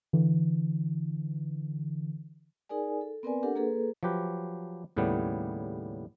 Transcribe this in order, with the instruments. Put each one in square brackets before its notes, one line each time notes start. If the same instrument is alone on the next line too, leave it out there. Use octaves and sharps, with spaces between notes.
[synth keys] D3 E3
[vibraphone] D#4 G#4 A#4 D5 G#5
A4
B3 C4 A#4 B4 D5 G#5
D4 G4 A4 A#4 F#5
A#3 G#4 A4 B4
[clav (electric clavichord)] F3 F#3 G4 B4
D#2 A2 C#3 G3 B3